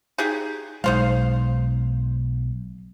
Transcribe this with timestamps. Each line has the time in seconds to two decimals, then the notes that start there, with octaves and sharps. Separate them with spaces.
0.18 D#4 G4 G#4
0.84 B1 G#3 D#4 C5 F5